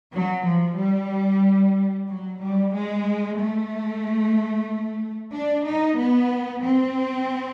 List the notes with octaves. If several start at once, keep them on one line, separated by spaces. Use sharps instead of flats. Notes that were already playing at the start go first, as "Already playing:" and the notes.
F#3
F3
G3
F#3
G3
G#3
A3
D4
D#4
B3
C4